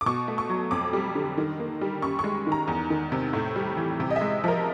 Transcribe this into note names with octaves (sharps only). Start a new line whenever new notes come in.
D6
B2 C#6
A3
C#6
F#3
F2 D6
G3
D3
D#3
A#3
G3
F#2 C#6
G#3 C#6
D#3
A#5
E2
D#3
C3
A2
G3
E3
C3
D#5
E5
G#3
F3 A#4